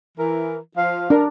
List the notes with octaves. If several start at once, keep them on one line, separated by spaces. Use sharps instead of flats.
E3 A#4
F3 F5
D4 A#4